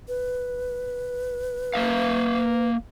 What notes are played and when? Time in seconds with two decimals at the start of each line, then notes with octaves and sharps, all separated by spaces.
0.08 B4
1.74 A#3 E5 F5